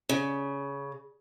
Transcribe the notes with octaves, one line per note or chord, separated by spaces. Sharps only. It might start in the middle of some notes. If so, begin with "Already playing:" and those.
C#3